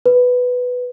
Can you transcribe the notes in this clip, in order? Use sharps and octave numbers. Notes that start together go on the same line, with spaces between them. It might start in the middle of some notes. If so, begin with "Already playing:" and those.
B4